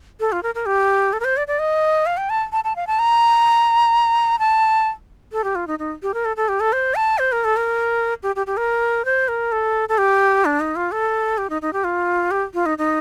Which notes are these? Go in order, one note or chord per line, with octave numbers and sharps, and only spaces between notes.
A4
F4
A#4
A#4
G4
A4
A#4
C5
D5
D5
D#5
F5
G5
A5
A5
A5
F5
A5
A#5
A5
A4
G4
F4
D#4
D#4
G4
A#4
A4
A4
G4
A4
C5
A5
C5
A#4
A4
A#4
G4
G4
G4
A#4
C5
A#4
A4
A4
G4
D4
D#4
F4
A4
G4
D#4
D#4
G4
F4
G4
F4
D#4
D#4